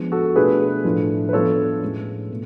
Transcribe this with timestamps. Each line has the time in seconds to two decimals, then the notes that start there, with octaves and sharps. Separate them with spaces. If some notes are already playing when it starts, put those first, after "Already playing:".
Already playing: F3 G#3 B3 D4
0.12 F#4 A4
0.36 B2 A3 D4 F4 G#4 B4
0.84 A2 F3 A3 D4 F4
1.29 B4
1.33 F3 B3 D4 F4 A4 C#5
1.82 A2 G#3 C#4
2.30 B2 A3